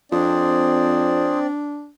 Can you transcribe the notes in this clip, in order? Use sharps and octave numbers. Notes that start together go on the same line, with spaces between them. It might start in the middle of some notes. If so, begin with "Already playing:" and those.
F2 C4 D4 G#4 C5 D5